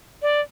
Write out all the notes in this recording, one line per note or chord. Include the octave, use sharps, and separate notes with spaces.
D5